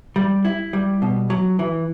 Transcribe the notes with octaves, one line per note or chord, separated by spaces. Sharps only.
G3
E4
G3
B2
F#3
E3